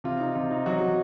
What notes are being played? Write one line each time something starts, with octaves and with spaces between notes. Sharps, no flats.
C3 F4
D#4
C3 F4
D#4
F#3 F#4
F#3